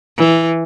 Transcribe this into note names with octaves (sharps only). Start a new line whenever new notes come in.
E3